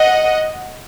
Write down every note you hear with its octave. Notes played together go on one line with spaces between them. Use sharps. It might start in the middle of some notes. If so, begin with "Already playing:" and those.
Already playing: D#5 F#5